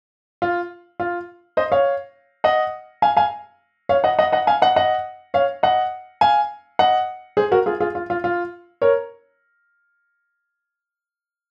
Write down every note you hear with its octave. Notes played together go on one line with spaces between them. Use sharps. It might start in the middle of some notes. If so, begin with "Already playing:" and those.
F4
F4
C5 D#5
C#5 F5
D#5 F#5
F5 G#5
F5 G#5
C#5 F5
D#5 F#5
D#5 F#5
D#5 F#5
F5 G#5
D#5 F#5
D#5 F#5
C#5 F5
D#5 F#5
F5 G#5
D#5 F#5
G#4 C5
F#4 A#4
F4 G#4
F4 G#4
F4
F4
F4
A#4 C#5